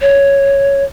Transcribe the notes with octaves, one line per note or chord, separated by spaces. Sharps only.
C#5